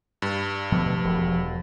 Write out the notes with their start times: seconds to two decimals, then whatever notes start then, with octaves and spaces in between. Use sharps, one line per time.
0.22 G2
0.72 B2 D3 F3 A3
1.04 E1